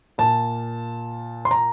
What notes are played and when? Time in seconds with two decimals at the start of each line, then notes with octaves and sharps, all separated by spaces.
0.18 A#2 A5
1.45 C6
1.51 A#5